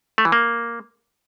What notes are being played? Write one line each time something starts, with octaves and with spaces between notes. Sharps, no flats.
A3
E3
A#3